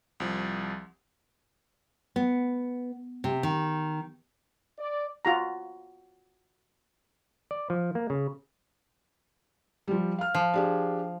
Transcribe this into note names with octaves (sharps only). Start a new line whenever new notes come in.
C2 F3
B3
C3
D#3
D5
F4 F#4 A#5
D5
F3
A#3
C#3
F3 G3
F5 F6
F3
D4 G4 G#4